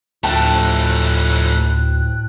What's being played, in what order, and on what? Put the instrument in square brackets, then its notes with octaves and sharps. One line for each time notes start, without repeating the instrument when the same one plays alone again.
[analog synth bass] D2 [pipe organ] A2 F#6 [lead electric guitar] F3 A3 [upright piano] G5 A5